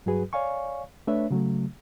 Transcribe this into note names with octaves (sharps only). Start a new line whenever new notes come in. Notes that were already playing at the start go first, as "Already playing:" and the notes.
G2 F#3 F#4 G#4 B4
C#5 D5 F5 G#5 C#6
A3 D4 B4 C#5 E5
C#3 F#3 A3